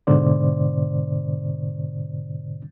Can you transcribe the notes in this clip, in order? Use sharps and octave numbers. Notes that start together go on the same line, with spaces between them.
G#2 B2 D3 C5 D5